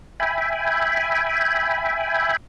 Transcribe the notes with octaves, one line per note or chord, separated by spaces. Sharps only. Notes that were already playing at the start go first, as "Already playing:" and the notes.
E5 G5 G#5 B5